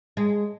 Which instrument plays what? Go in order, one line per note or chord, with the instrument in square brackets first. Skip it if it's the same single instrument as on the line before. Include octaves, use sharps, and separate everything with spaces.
[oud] G#3